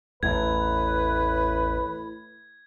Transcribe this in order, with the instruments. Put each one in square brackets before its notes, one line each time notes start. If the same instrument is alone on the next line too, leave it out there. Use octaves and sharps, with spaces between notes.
[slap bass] A1 E2 [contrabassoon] A2 [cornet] B4 [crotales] G#6